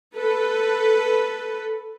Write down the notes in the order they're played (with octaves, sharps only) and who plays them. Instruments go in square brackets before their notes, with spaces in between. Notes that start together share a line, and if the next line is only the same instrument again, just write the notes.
[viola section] A4 B4